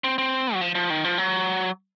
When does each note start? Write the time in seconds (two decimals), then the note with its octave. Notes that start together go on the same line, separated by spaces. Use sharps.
0.04 C4
0.18 C4
0.54 F#3
0.61 F3
0.75 F3
0.90 D#3
1.04 F3
1.18 F#3